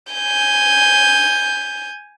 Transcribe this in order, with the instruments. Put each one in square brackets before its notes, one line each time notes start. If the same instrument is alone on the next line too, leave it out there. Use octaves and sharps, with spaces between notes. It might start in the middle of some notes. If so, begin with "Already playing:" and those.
[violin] G#5 G6